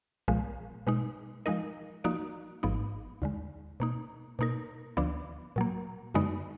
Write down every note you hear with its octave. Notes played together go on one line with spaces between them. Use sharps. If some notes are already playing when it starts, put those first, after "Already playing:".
B1 A#2 F3 G#3
B2 G#3 D#4
F3 G#3 D#4 A#4 D#5
F3 A#3 D#4 F#4 D5
G#1 G#2 F3 B3 D#4
D#2 D3 G#3
B2 A#3 D#4
B2 A#3 D#4 A#4
D2 D3 F3 B3 D4
A#2 F#3 A#3
F#2 D3 G#3 B3 D#4